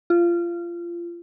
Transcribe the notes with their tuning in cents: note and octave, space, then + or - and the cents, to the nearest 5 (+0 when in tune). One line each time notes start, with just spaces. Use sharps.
F4 -25